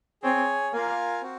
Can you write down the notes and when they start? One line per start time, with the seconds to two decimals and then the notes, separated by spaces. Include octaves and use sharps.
0.23 C4 G#4 C#5 G#5
0.72 A#3 F4 A#4 F5 G#5
1.22 C4 F#4